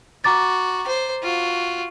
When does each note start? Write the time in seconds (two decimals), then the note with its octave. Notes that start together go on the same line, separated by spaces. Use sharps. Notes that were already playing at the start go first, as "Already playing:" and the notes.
0.24 F#4 A#5 D6 A6
0.87 C5
1.23 F4 F#4